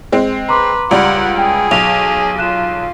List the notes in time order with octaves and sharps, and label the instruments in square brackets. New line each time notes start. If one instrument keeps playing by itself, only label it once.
[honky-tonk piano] G#3 C4
[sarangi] B4 [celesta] A#5 C6 D6
[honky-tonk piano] C#2 G3 [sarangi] F#5
[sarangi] G#4 [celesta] G5
[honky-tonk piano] B1 [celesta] F7
[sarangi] F4 [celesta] F#6 E7